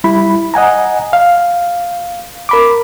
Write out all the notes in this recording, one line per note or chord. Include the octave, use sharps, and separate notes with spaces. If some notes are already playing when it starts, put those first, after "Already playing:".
G3 E4 B5
D#5 F#5 G#5 A#5
F5
A#4 B5 D6